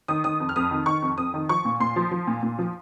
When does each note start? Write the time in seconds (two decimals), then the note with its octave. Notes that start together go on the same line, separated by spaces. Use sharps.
0.08 D#3 D#6
0.24 D#3 D#6
0.40 F2
0.49 F6
0.56 F2 D#6
0.71 D#3
0.86 D#3 C#6
1.02 F2
1.18 F2 D#6
1.34 D#3
1.49 F3 C#6
1.65 A#2
1.80 A#2 C6
1.96 F3
2.11 F3
2.27 A#2
2.43 A#2
2.59 F3